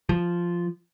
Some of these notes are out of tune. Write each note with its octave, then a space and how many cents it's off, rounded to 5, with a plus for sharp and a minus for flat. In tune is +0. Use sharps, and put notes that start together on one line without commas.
F3 -5